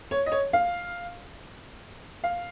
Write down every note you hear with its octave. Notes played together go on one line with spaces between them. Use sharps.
C#5
D#5
C#5
F5
F5